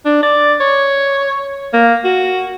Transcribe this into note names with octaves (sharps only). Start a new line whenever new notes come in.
D4
D5
C#5
A#3
F#4